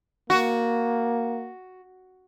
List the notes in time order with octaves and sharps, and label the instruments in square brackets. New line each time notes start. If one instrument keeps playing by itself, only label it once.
[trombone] A#3 [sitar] F#4